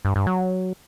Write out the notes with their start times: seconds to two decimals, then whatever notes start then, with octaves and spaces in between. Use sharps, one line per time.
0.05 G2
0.16 G2
0.27 F#3